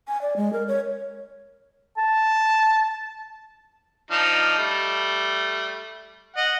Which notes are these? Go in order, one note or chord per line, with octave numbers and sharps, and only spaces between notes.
G#5
D5
G#3
A#4
C#5
A5
F3 D4 D#4
G3 A3
D#5 F#5